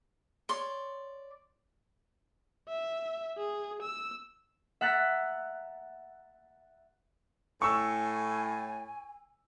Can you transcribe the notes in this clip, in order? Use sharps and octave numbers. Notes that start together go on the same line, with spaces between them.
C#5 D5 C6
E5
G#4
E6
E5 F#5 A#5 F#6 A6 B6
A2 G#5 C#6 E6